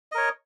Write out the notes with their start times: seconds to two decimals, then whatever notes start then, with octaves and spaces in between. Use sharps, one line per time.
0.12 D#5
0.15 A#4
0.18 C#5